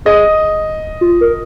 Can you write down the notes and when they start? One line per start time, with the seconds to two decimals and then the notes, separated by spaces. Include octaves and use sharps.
0.05 G#4 D#5
1.01 F4
1.21 A#4